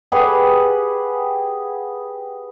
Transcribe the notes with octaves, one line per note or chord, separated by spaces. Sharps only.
G4 G#4 B4 F#5